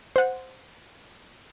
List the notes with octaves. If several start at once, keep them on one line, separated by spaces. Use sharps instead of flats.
C5 F#5